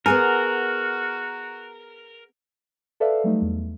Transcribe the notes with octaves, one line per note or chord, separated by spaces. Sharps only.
B3 F#4 G#4 A#4 G#5
A4 B4 D5 E5 F5
F#3 G3 A3 D#4
E2